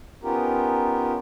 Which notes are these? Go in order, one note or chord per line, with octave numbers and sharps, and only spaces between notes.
B3 C#4 D#4 F4 G4 A#4